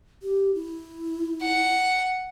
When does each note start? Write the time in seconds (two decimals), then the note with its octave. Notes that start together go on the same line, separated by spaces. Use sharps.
0.23 G4
0.54 E4
1.42 F#5